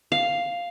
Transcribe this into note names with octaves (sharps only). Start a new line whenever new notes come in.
F5